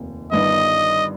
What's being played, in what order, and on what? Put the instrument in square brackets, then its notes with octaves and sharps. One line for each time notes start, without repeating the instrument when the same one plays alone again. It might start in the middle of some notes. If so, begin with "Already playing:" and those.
Already playing: [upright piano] F1 D#2 D#3
[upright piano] G1 G2 D#3 B3 [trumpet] D#5